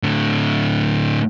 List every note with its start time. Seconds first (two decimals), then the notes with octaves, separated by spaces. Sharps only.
0.03 A2 D3